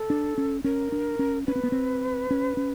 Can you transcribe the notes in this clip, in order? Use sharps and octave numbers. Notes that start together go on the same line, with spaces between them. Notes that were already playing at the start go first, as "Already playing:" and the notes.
Already playing: A4
D4
C#4
C#4 A#4
D4
C#4
C#4 B4
C4
B3
C4
C#4
C#4